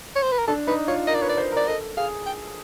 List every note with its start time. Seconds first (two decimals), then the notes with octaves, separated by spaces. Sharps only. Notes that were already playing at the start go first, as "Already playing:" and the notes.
0.16 C#5
0.23 C5
0.32 B4
0.39 A#4
0.48 D4 A4
0.67 D#4 B4
0.87 F4 C#5
1.07 A#4 D#5
1.15 D5
1.22 B4 C#5
1.29 D5
1.37 C5
1.52 A#4 D5
1.68 A4 D#5
1.97 G#4 F5
2.26 G5